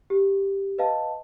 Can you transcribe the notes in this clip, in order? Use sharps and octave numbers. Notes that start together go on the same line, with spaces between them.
G4
B4 D#5 F5 A5